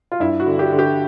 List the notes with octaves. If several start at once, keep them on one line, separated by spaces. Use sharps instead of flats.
F4
G2 E4
F#4
D3
G4
D3
G4